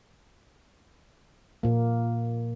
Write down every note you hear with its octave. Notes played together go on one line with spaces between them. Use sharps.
A#2 A#3